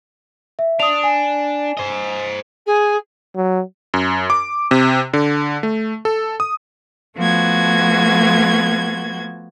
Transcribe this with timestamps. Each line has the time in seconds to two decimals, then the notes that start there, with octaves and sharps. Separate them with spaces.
0.59 E5
0.80 D4 D#6 F7
1.04 G#5
1.77 C5 D#5
2.66 G#4
3.36 F#3
3.94 F#2
4.30 D6
4.71 C3
5.13 D3
5.63 A3
6.05 A4
6.40 D#6
7.18 F3 A3 B3 F#4 G#6